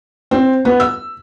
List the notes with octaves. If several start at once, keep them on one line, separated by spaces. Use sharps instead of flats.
C4
B3
E6